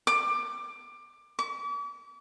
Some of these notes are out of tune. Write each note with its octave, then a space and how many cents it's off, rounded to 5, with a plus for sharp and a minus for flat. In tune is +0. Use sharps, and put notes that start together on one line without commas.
D6 +20
D6 -45